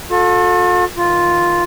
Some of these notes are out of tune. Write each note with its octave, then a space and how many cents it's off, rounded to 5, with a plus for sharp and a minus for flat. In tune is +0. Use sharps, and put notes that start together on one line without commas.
F4 +45 A4 +0
D#3 +0 F4 +0